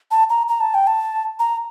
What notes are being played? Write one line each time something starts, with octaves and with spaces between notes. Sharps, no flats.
A5
A#5
A#5
A5
G5
A5
A#5